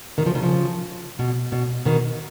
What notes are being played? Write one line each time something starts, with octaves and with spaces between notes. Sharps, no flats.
B2 D#3
C#3 F3
B2 D#3
C#3 F3
B2
B2
B2 D#3